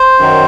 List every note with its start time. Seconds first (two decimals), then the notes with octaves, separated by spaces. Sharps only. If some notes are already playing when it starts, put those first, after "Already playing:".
Already playing: C5
0.19 F#2 D#3 F#3